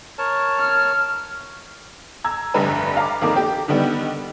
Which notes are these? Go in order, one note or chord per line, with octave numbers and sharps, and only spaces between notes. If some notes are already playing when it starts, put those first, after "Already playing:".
A#4 C#5 A5
F6
A#5 E6 G#6
F1 C2 G2 D3 B4 A#5
F5 A#5 D6
F#1 F2 D#3 A#3 A#4 D6
G4
D3 D#3 G3 B3